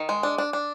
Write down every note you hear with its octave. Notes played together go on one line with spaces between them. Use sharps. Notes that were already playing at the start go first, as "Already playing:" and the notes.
Already playing: D#3
G#3
D4
D4
D4